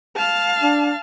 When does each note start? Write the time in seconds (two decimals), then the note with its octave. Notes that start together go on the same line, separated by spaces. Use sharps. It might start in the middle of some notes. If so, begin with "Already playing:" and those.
0.16 F5 A5
0.61 D4